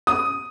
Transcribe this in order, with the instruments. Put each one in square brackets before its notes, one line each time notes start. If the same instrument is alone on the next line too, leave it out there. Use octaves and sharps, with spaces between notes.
[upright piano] D#6